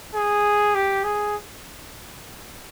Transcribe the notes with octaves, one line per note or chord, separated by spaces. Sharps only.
G#4
G4
G#4